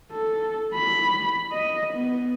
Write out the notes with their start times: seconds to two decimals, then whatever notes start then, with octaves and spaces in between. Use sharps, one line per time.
0.12 A4
0.75 B5
1.52 D#5
1.94 B3